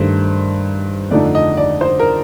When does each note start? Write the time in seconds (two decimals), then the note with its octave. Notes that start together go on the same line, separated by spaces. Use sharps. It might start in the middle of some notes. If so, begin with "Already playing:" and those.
Already playing: G2 D#3 A3 C5
1.10 F2 D3 A3 D#4 D5
1.35 D#5
1.57 D5
1.81 C5
1.99 A#4